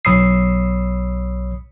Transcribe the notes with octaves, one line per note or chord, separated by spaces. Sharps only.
B1 C#5 B5 D#6 E6 C7